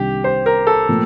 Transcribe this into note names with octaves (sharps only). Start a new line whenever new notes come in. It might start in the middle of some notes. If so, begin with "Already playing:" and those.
Already playing: C2 C3 D#3 G3 D4 G4
C5
A#4
A4
A#2 F3 A3